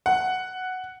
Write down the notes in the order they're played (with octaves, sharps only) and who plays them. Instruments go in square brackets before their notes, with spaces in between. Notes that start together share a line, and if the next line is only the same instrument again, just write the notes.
[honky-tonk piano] F#5